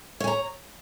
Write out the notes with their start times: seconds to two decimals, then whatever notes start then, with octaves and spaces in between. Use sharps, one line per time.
0.20 C#5
0.24 G#5
0.27 A#5